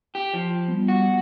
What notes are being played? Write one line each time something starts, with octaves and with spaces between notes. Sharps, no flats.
G4
F3
G3 B3
F#4